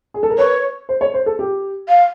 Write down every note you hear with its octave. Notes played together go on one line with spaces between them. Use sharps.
G#4
A4
A#4
B4 C#5
C5
C#5
C5
A4
G4
F5